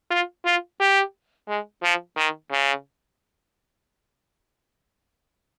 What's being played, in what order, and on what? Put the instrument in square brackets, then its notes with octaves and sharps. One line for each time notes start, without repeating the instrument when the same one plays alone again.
[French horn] F4
F4
G4
G#3
F3
D#3
C#3